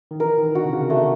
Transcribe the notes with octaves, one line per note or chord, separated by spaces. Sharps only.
D#3
E3 A#4
D#3
D3 F#4
C3
C#3
D3 A3